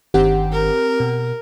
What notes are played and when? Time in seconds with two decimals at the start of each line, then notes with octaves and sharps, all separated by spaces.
0.14 G1 D#3 C4 G4 F#5
0.53 A#4
1.00 B2